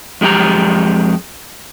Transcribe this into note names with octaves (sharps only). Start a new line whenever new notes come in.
F2 G#3 E4 G4 A#5